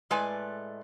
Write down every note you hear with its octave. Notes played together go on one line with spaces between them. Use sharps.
A2 G#3 A3 B4 D5 G#5